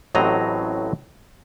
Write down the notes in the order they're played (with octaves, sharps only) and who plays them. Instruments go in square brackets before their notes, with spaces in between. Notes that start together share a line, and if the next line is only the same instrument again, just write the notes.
[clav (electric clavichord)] A1 A2 F#3 C4 D#5 A#5